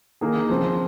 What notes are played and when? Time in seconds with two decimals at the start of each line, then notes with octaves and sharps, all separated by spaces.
0.21 D#3 A#3 D#4 G#4
0.49 C#3 F3 C4